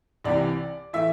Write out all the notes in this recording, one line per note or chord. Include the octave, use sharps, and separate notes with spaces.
C2 C3 E3 D5
A2 E3 E5